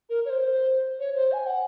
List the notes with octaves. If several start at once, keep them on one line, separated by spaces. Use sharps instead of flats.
A#4
C#5
C5
C#5
C5
G#5
F#5